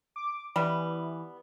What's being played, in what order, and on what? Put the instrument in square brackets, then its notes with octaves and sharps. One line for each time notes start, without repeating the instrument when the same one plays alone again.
[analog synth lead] D6
[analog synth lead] E3 [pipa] G3 B3